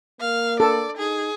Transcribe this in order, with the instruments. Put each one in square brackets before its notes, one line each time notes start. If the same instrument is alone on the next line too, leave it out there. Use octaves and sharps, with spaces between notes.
[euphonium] A#3 [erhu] F5
[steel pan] A4 [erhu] D5
[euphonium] D#4 [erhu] G#4